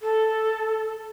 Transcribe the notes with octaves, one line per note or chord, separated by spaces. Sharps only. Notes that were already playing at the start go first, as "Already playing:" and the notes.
A4